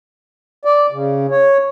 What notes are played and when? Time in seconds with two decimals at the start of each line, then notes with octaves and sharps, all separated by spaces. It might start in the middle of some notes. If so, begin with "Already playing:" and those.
0.65 D5
0.92 C#3
1.31 C#5